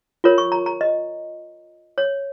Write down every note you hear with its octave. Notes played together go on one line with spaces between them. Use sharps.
F4 A#4 C#5
C#6
A#5
A#5
D#5
C#5